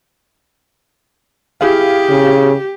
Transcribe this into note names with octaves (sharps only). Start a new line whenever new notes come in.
E4 G4 G#4 F5
C#3